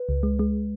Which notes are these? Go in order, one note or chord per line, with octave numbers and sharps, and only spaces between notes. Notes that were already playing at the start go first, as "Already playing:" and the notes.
Already playing: B4
C#2
G#3
G#3